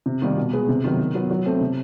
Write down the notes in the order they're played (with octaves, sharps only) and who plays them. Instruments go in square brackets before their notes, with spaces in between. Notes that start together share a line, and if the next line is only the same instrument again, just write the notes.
[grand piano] C3
D#3 G3 A#3
B2
G#3 B3
C3
D#3 F#3 B3
D#3
F#3 B3
F#3
A3 C4
C3